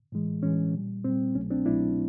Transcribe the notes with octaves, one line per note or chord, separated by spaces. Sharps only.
A2 E3 G#3
A2 E3 G#3 C#4
A#2 G3
A#2 G3 C4
C2 B2 F#3 A3 C#4
C4 D4
C2 B2 F#3 A3 D4 E4